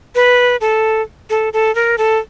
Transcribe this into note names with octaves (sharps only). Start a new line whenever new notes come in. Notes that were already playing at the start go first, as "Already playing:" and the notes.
B4
A4
A4
A4
A#4
A4